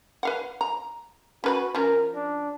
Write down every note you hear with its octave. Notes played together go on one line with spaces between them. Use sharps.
B4 F5 F#5
A#5
C#4 F#4 B4 B5
F3 C#4 A#4
D4